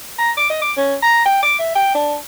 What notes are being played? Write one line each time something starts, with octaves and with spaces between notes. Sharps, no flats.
A#5
D6
D#5
D6
C#4
A#5
G5
D6
E5
G5
D4